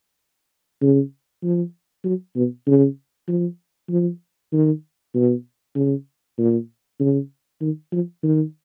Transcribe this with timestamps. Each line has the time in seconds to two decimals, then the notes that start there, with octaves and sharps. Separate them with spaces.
0.82 C#3
1.43 F3
2.05 F#3
2.36 B2
2.67 C#3
3.28 F3
3.90 F3
4.53 D#3
5.14 B2
5.75 C#3
6.38 A#2
7.00 C#3
7.61 D#3
7.92 F3
8.23 D#3